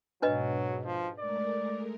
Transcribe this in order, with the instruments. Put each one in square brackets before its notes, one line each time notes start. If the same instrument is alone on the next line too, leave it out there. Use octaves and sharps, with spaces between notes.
[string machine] G#2 B2 [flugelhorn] F#3 [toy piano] D4 B4 D#5
[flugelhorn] F3
[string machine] G#3 A3 A#4 [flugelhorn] D5